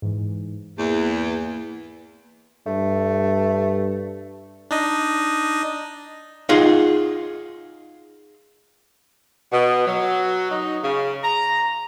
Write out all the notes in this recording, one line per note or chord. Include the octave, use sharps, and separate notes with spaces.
G#2 E3
E2 A#3
G2 A3
D4 D#4 D#5
D#4 F4 G#4 F5 F#5
B2
F#3
D#4
C#3
A#5